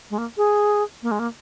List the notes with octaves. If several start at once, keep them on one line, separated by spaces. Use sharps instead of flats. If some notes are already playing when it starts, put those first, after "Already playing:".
G#3
A#3
G#4
A#3
G#3
A#3